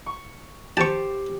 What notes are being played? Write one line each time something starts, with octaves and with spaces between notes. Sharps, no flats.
C#6
G4 C5 A5 C#6